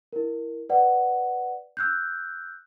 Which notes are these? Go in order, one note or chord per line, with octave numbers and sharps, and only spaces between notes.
E4 A#4
B4 D5 F#5
E6 F#6 G6